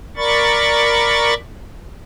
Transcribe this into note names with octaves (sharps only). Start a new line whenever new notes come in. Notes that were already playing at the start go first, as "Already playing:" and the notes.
A#4 D5 B5 C#6 A6